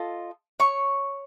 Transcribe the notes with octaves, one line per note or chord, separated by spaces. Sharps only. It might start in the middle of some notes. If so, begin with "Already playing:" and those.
Already playing: F4 A4 D#5
C#5 C#6